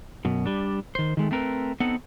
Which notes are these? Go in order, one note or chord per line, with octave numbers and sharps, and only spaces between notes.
F#2 B2
G3 D4
D#3 C5
D#3 G#3 A3
A3 C4 A#4 B4
B3 C4 D#4 A4 F#5